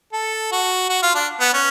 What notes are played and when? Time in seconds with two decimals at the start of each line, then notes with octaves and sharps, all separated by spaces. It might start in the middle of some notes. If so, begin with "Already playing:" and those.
0.13 A4
0.52 F#4
0.90 F#4
1.03 F4
1.15 D4
1.40 B3
1.54 C#4